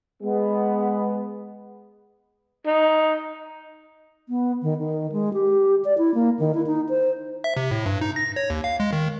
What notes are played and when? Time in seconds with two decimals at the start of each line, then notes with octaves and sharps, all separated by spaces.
0.23 G#3 B3
2.66 D#4
4.28 B3
4.62 D#3
4.79 D#3
5.12 G#3
5.33 G4
5.85 D5
5.98 E4
6.14 A#3
6.39 D#3
6.54 E4
6.66 D#4
6.89 C5
7.44 E5
7.57 C3
7.71 A2
7.86 G2
8.01 D#4
8.16 A#6
8.36 C#5
8.50 D#2
8.64 F5
8.80 G#3
8.93 D#3